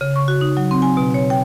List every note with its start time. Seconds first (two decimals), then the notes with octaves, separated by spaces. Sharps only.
0.01 C#3
0.16 C#6
0.28 F#4
0.41 D#4
0.57 F#3
0.71 C4
0.82 G#5
0.97 B2
1.14 C#5
1.30 G5